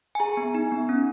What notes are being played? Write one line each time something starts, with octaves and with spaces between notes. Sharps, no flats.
G#5
G#4 A#5
B3
D#4
B3
C#4